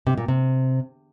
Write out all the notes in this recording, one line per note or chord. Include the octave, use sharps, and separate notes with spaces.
C3
A#2
C3